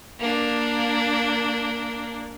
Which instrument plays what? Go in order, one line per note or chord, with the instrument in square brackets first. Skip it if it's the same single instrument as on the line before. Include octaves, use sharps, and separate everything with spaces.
[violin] A#3 D4